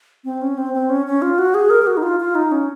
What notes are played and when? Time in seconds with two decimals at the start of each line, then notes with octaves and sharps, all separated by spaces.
0.25 C4
0.42 C#4
0.58 C4
0.74 C4
0.90 C#4
1.07 C#4
1.22 F4
1.38 F#4
1.54 G#4
1.70 A#4
1.82 G#4
1.87 F#4
1.97 D#4
2.03 F4
2.20 F4
2.35 D#4
2.52 C#4